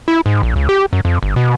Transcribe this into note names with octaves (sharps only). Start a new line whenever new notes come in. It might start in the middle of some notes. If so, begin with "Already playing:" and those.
E4
G#2
A#1
C#2
G4
F#2
F2
G1
B2